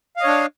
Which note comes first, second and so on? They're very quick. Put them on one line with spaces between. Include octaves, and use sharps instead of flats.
F5 D#5 C#5 D4